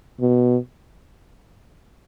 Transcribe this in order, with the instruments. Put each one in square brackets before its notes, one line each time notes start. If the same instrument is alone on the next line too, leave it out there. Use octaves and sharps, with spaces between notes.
[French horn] B2